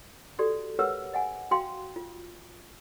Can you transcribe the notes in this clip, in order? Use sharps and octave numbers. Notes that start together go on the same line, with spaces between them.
F#4 G4 A4 D5
G4 A#4 B4 C#5 F#5 E6
D#5 F#5 G#5
F#4 F5 G5 C6
F4